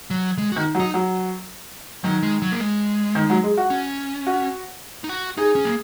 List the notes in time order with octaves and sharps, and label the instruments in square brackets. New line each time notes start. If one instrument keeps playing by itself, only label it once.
[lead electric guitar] F#3
G#3
[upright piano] D#3 [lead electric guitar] F#4
[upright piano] F#3
[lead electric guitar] D#4
[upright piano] F#3
[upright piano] D#3 [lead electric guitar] F#3
[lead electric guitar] G#3
F#3
A#3
G#3
[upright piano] D#3
F#3
G#3
F#4
[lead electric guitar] C#4
[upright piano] F#4
[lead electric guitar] D#4
F#4
[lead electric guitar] D#4 [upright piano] G#4
[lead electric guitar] C#4
A#3